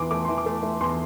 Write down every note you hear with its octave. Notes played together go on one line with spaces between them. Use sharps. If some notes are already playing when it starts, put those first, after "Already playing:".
Already playing: E2 E3 C6 D6
A3 D6
E3 C6
D6
A3
A3
E2 C6